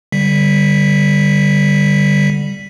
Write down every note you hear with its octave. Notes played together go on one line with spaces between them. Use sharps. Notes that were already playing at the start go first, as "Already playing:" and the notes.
D3 G3 B6